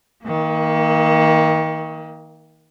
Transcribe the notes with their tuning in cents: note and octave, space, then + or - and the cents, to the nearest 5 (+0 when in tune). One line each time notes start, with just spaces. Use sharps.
D#3 +30 A#3 -5